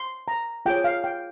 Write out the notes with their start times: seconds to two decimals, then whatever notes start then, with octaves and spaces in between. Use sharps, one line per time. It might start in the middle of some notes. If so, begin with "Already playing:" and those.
Already playing: C6
0.28 A#5
0.66 F4 G#4 C#5 G5
0.84 F5
1.04 G5